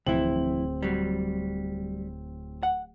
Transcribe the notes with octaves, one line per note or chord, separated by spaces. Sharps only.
D1 F2 E3 C4 E4 F#7
F#3 G3
F#5